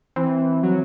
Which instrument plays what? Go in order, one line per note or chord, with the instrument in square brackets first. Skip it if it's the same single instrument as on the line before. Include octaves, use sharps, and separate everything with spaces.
[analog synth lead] E3 [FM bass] C4
[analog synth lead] F#3